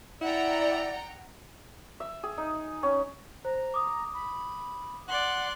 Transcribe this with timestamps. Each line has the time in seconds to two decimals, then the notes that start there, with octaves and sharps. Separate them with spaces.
0.21 E4 D5 F#5 G5 A#5
2.00 E5
2.23 G#4
2.38 D#4
2.83 C#4
3.45 C5 A#5
3.74 D6 D#6
4.14 B5
5.08 D5 F#5 C6 F#6